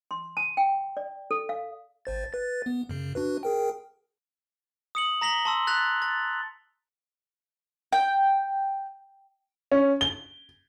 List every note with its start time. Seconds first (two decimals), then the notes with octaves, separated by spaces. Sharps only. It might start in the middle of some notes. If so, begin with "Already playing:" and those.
0.11 C6
0.37 A5
0.57 G5
0.97 D5
1.31 A4
1.49 F5
2.05 G#1 C5 A6
2.33 B4 A6
2.66 B3
2.89 F#2 C#3
3.15 D4 F#4 B4
3.43 G#4 A#4 G5
4.95 D#6 C#7 F#7
5.21 A#5 A#6 B6 F#7 G7
5.45 A5 C6 E6
5.67 F#6 A6 B6 F7
6.02 A6
7.93 G5
9.72 C#4
10.01 G7